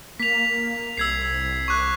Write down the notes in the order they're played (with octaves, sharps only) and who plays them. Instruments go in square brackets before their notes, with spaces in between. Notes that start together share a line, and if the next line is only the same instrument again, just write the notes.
[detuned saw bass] A#3 [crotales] B6 F7
[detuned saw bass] C2 [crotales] E6 G#6 C7
[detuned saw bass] C2 [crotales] C#6 D6 F#6